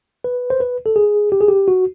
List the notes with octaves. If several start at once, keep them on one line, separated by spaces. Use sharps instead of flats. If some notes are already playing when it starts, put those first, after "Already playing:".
B4
C5
B4
A4
G#4
G4
G#4
G4
F#4